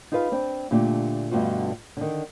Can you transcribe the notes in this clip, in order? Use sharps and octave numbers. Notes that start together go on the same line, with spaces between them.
D#4 F4 G#4 B4 C#5 F5
C4 D4
A#2 D3 A3 D4 G4
G2 B2 D3 A3 F4 F#4
D3 D#3